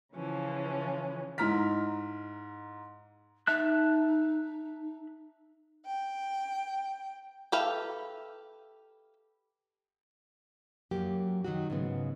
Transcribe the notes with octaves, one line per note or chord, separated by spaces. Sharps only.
C#3 E3 F3 C#4
G#2 E4 A#5 F6 B6
D#4 E5 A5 F#6
G5
G4 A4 B4 E5 F5
F#2 F#3 A#3 G4
D#3 F#3 F#4
G#2 C#3 B3